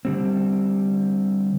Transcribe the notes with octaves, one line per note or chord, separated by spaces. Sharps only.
D3 G3 C4